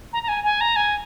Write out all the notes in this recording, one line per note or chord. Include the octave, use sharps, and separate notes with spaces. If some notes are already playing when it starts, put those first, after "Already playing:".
A#5
A#5
G#5
G#5
A#5
G#5